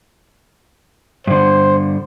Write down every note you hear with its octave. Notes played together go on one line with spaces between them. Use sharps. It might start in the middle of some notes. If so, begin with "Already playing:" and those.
G2 D3 C5